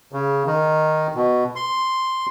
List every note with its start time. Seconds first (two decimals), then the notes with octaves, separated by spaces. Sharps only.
0.12 C#3
0.46 D#3
1.15 B2
1.56 C6